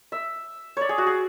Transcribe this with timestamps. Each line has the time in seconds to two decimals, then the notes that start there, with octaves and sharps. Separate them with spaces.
0.12 E5
0.77 C#5 D5
0.89 G#4
0.98 F#4
1.06 G#4